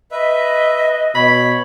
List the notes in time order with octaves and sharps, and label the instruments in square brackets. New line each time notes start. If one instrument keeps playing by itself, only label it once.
[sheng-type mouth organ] B4 E5 [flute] D#5
[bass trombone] B2 [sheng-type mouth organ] C#5 [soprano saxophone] B5